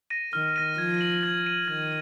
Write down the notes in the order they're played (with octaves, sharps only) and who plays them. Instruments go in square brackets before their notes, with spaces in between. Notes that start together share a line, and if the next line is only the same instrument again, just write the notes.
[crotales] A#6 D#7
[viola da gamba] D#3 [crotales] F6
[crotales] A#6 D#7
[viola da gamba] F3 [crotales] G#6
[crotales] D#7 F#7
G#6
D#7 F#7
[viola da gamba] D#3 [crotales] G#6